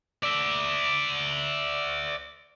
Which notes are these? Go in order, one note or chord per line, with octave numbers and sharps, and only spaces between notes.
D5 E5